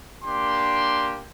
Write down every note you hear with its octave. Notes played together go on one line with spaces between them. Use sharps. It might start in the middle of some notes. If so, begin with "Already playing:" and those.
A#3 D4 G4 C6